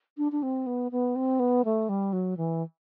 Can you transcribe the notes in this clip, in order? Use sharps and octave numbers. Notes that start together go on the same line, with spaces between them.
D4
D4
C4
B3
B3
C4
B3
A3
G3
F#3
E3